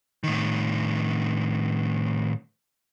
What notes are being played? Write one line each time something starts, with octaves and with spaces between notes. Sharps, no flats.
A2 D#3